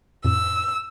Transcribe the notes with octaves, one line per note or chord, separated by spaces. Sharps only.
F2 A2 E6